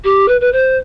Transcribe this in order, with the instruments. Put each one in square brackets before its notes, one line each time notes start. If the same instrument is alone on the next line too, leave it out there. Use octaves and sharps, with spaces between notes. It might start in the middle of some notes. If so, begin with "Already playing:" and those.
[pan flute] G4
B4
B4
C5